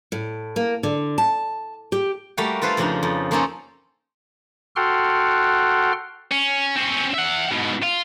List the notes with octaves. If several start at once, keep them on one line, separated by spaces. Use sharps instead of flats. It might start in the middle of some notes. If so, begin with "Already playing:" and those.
A2
A#3
D3
A5
G4
G3 A3 A#3 F#4 F5 G5
F4 A4 B4 C5 F5
F2 C#3 F3 D4 D#4 G#4
F2
F3 A#3 C4 C#4 D#4 A4
F#4 A4 F#5 G5 C6 F6
C#4
C4 C#4
E5 F#5
G#2 B2
F4